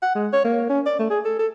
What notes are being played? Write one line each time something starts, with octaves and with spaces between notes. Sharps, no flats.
F#5
G#3
C#5
A#3
C#4
D5
A3
G#4
A4
A4